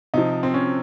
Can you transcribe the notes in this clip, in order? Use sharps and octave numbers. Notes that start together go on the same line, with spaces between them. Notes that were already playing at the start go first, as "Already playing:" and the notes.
C3 F3 D#4
C4
C#4